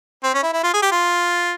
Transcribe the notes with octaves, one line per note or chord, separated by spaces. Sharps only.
C4
C#4
E4
E4
F4
G#4
G4
F4